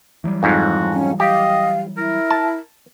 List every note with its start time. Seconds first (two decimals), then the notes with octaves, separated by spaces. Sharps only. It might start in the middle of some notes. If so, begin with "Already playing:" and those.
0.24 E3 F#3 G3
0.43 F2 G#2 F#4
0.93 C#4
1.20 G4 D#5 F5
1.98 E4 A#4
2.31 A5